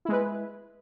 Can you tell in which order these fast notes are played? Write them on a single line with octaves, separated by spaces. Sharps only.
E4 G#3 B4